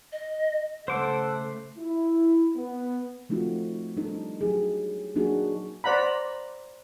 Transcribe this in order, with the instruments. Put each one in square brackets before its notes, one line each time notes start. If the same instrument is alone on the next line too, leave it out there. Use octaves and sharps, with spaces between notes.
[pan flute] D#5
[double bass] C#3 A3 [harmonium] A4 F#5 [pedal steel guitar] C5 D6
[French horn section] E4
B3
[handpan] F3 A3 C4 D#4 F4 F#4
G3 D4 D#4 A4
F#3 D#4 G4 G#4
F#3 A#3 D4 D#4 F#4 G#4
[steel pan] C5 D5 F#5 A#5 B5